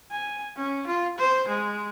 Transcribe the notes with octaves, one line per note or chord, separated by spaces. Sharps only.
G#5
C#4
F4
C5
G#3